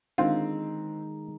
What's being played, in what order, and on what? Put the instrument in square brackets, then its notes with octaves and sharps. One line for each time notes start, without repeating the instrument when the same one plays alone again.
[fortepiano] D3 C4 [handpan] D#3 G#3 D#4 [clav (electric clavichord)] F4